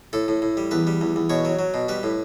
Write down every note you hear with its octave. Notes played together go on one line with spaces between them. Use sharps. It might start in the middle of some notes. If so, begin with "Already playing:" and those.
A2 A4
A2
A2
G3
E2 B4
G3
E2
E2
B2 C#5
F#3
F#3
B2
G3 B4
A2